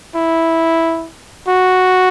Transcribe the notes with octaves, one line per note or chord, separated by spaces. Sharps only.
E4
F#4